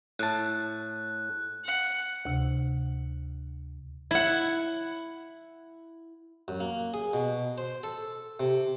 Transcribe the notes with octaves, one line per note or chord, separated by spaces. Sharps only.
A2 A5 F#6
F#5
D2 C3
E4 F#5
F#2
A#3
G#4
B2
C5
A4
C3